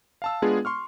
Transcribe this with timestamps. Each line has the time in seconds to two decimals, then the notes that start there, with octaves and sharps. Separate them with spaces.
0.22 F5 A5 E6
0.42 G#3 B3 D4 F4 G#4
0.65 C6 C#6 F6